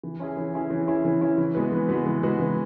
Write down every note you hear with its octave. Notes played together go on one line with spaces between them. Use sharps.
E3
C#4 E4 G#4
E3
C#4 E4 G#4
E3
C#4 E4 G#4
E3
C#4 E4 G#4
E3
G#3 B3 F#4 B4
E3
G#3 B3 F#4 B4
E3
G#3 B3 F#4 B4
E3